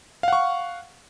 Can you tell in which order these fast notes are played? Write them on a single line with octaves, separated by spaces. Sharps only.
F5 F#5 C#6